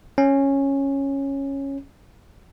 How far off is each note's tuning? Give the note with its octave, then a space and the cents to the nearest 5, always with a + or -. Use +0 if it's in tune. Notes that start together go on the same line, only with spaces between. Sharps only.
C#4 -10